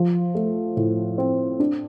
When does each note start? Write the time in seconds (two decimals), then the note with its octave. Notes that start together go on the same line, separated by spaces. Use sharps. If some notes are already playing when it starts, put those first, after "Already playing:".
Already playing: F3
0.35 A3
0.77 A2
1.18 C4
1.60 D4